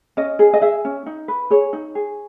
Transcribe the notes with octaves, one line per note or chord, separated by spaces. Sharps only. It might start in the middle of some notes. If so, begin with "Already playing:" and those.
C#4 D#5
G#4
D#5
G#4 E5
C#4
D#4
B4
G#4 C#5
D#4
G#4